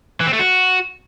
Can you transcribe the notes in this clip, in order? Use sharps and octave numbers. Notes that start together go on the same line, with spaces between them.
E3
C4
A3
F#4